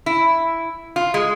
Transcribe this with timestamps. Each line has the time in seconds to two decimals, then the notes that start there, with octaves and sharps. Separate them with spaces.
0.06 E4
0.96 F4
1.14 G#3